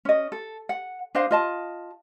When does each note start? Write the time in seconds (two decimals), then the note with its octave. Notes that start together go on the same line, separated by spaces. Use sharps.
0.05 C#4 D#5
0.32 A4
0.69 F#5
1.15 D4 C5 D#5 F5
1.31 F4 D#5 A5